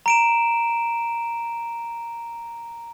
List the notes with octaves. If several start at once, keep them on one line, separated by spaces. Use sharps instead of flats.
A#5 D7 E7